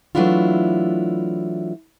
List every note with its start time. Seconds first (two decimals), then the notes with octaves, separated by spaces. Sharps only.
0.15 E3 F#3 A3 D4 E4 F4